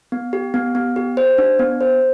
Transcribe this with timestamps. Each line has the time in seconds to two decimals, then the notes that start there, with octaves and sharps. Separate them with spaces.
0.12 B3
0.33 G4
0.54 B3
0.75 B3
0.96 G4
1.17 C5
1.38 D4
1.59 B3
1.81 C5